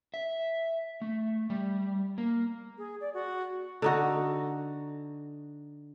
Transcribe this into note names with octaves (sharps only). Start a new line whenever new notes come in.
E5
A3
G3
A#3
G#4
D5
F#4
D3 D#4 F#4